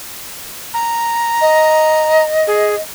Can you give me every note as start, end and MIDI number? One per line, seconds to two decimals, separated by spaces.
0.74 2.24 82
1.41 2.80 75
2.47 2.75 68